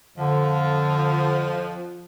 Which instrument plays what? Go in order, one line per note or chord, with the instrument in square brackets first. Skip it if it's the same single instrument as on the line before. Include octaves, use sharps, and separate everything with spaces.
[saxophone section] F2 F3 [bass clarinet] D3